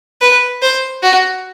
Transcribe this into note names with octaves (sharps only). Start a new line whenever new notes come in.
B4
C5
F#4